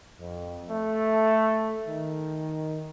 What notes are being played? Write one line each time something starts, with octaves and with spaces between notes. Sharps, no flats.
F2
A3
D#3